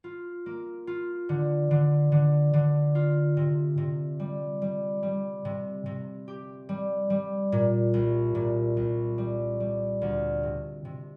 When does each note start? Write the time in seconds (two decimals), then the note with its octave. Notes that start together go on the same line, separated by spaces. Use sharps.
0.04 F4
0.46 A#3
0.87 F4
1.29 D3
1.71 D3
2.12 D3
2.53 D3
2.95 F4
3.37 C3
3.78 C3
4.20 G3
4.62 G3
5.03 G3
5.45 C3
5.86 C3
6.28 G4
6.69 G3
7.10 G3
7.52 A#2
7.94 C2
8.35 A#2
8.77 C2
9.18 G3
9.60 G3
10.02 D2
10.43 C3
10.85 C3